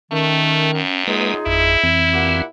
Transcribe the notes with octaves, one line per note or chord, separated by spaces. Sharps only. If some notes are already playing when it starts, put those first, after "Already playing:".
D#3 A3 C#4
F#2
G#3 A#3 D#4 F4 G#4 B4
G#1 F2 E4
F2 E3 C4
A#2 G4 F#5